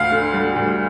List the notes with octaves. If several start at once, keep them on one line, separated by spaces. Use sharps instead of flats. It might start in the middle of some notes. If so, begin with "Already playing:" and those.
Already playing: D2 F5
D3
G3
D2